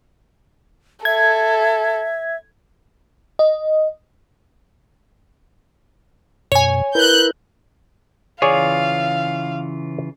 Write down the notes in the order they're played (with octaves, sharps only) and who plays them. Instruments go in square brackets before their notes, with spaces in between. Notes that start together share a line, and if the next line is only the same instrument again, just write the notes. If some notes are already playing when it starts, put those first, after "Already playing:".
[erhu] A4 [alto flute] E5 [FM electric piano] G#6
[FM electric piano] D#5
[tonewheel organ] F#2 B2 [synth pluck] C#5 G#5
[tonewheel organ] E4 A#4 B4 [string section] F#6 G6
[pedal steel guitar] C#3 E3 F4 [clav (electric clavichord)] G#4 C#5 D5 [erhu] F5